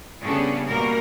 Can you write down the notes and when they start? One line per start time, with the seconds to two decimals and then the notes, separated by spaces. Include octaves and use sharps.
0.22 C#3 G3 B3 D4 G#4 A4
0.67 B2 G3 A#3 B3 A#4